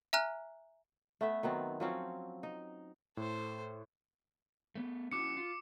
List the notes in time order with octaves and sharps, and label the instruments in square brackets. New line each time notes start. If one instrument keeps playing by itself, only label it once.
[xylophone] E5 G#5 A#5 F6 F#6
[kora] A3 B3 E5
D#3 F#3 B3 C4
F3 F#3 C4 C#4
D#4
[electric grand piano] A2 [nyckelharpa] A4 C5
[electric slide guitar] A3 B3
[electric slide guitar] C#4 E4 F#4 [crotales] D6 C#7
[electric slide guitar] F4